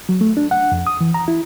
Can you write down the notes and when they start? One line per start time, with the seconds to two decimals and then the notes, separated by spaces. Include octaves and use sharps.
0.09 F#3
0.21 A3
0.37 D4
0.51 F#5
0.72 F2
0.87 D#6
1.01 E3
1.14 A#5
1.28 E4